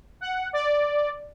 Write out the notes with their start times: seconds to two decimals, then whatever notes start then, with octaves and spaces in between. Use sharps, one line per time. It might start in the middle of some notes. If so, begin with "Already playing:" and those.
0.21 F#5
0.53 D5